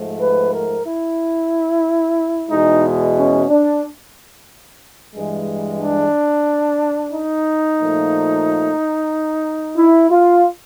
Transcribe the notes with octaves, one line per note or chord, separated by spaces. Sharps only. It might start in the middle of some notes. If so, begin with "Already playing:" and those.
Already playing: G#2 F3 A3
B4
A#4
E4
E2 B2 G#3 D#4
C#4
D4
G2 E3 G#3
D4
D#4
A#2 F3 A3
E4
F4